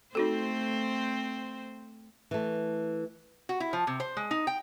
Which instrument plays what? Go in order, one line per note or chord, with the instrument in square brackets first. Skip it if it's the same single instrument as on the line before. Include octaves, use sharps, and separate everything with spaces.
[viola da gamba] A3 C4 C5 [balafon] D#4 F#4 A4
[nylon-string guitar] E3 A3
[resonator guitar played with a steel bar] F#4
E4
F3
C3
C5
G#3
D#4
G5